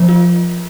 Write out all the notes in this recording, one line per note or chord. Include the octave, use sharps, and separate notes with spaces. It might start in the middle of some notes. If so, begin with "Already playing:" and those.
Already playing: F3
F4